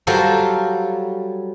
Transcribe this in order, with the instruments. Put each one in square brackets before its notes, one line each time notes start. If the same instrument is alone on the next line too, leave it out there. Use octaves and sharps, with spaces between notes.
[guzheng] F#3 G3 F4 A4 A#4 C5